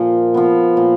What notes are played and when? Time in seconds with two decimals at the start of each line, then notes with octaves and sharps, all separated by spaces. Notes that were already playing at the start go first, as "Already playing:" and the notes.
Already playing: A#2 F3
0.34 F3 B3
0.77 A#2